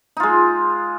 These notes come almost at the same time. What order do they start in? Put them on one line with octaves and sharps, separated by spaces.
D#4 F4 G#3